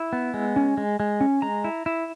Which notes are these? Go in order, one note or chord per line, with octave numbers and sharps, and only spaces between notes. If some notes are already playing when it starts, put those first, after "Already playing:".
Already playing: E4
B3
G#3
C#4
G#3
G#3
C#4
G#3 A#5
E4
E4